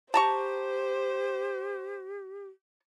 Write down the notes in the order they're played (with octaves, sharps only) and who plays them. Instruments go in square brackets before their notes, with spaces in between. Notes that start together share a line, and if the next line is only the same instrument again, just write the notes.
[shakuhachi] G4 [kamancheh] C5 [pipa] A5 A#5 C#6